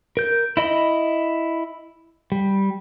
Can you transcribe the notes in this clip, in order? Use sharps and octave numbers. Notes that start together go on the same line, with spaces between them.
A#4 G6
E4 D#5 B5
G3